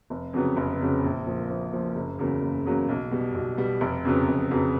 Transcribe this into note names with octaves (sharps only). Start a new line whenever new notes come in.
F1
F2 C#3 F#3 B3
F1
F2 C#3 F#3 B3
A#1
A#2 F3
A#1
A#2 F3
F#1
E2 C#3 F#3 A#3
F#1
E2 C#3 F#3 A#3
B1
B2 G3
B1
B2 G3
F1
F2 C#3 F#3 B3
F1
F2 C#3 F#3 B3